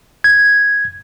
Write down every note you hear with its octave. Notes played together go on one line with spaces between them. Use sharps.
G#6